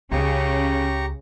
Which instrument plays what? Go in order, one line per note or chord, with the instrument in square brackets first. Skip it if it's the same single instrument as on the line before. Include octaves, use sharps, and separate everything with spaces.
[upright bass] C#2 [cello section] C#3 [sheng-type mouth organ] G4 A#5 C#6